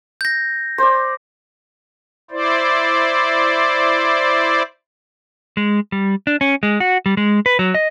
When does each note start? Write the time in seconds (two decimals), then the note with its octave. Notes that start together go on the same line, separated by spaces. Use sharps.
0.21 G6 A#6
0.78 C5 D5
2.31 E4 C5 D5
5.57 G#3
5.92 G3
6.27 D4
6.41 C#4
6.63 G#3
6.80 F#4
7.06 G3
7.17 G#3
7.46 B4
7.59 F#3
7.74 D#5